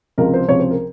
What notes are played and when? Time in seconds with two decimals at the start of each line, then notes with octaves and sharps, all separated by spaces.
0.18 C#2 C3 F3 A#4
0.34 C5
0.48 C#2 C3 F3 C#5
0.60 C5
0.71 A#4